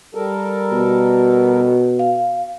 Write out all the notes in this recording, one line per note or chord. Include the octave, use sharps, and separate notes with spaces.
G3 A4 A#4
B2
F5